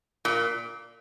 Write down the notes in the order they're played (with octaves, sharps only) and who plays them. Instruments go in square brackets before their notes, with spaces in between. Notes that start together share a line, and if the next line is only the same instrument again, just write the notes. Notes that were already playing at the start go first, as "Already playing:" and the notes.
[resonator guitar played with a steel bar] A#2